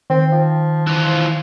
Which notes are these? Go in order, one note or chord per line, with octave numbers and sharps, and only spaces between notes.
D#3 C4
F3
E3 F4